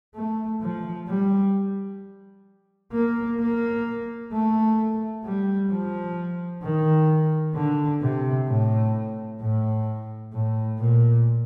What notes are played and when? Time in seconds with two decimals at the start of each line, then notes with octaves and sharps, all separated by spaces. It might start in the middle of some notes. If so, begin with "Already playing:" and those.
0.15 A3
0.61 F3
1.08 G3
2.93 A#3
3.40 A#3
4.32 A3
5.25 G3
5.71 F3
6.62 D#3
7.55 D3
8.01 C3
8.48 A2
9.41 A2
10.32 A2
10.80 A#2